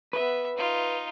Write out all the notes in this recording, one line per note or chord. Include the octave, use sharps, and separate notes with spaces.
B3 B4 E5
D#4 F4